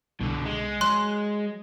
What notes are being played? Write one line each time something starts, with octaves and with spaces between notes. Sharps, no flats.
C2 B2 D3
G#3
F#3 C6 F#6